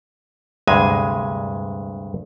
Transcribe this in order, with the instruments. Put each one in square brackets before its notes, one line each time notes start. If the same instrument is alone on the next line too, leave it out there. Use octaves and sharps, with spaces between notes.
[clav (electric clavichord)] D2 G2 C3 G#3 G#5